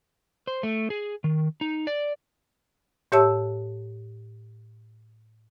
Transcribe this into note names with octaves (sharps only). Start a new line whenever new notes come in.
C5
A3
G#4
D#3
D#4
D5
A2 G4 C#5 E5 A5 E6